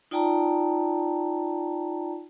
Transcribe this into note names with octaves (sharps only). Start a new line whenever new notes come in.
D#4 F4 D5 G5 A5 A#5